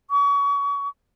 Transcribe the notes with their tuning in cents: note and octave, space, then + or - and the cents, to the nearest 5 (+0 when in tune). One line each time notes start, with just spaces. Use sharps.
C#6 +35